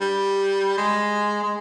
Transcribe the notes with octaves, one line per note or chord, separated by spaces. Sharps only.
G3
G#3
G#3